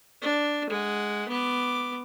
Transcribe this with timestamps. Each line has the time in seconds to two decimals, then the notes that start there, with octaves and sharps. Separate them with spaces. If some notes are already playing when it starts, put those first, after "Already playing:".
0.21 D4
0.70 G#3 F#5
1.29 B3 D6